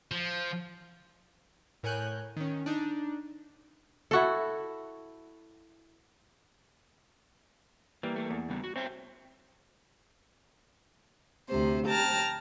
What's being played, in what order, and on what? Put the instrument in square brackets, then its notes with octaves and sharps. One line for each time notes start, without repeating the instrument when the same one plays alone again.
[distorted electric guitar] F3
[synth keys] A2 A#4 C#5 G#5 F#6 G6
D#3 C#4
D4 D#4
[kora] E4 F#4 A4
[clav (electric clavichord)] E3 G3 [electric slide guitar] A#3
[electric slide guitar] A3 A#3
[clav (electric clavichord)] E2
[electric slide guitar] C#3 G3 B3
F#4
[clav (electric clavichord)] C4 [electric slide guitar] C#5 E5 G5
[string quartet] D2 C3 C5
G5 A5 A#5 F6